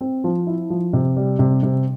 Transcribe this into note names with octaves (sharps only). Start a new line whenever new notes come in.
C4
F3
E4
F3
C3
G3
C3
C3